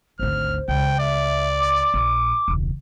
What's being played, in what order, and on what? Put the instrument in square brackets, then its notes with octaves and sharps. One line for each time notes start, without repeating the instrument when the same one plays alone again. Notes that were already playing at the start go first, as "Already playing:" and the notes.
[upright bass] G#1 D2 [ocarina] C5 [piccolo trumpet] F6
[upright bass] C#2 [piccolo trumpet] G5
[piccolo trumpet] D5 [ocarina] E5
[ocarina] D6
[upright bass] A#1
E1 C#2